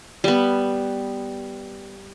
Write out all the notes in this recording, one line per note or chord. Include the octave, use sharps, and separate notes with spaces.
G3 B3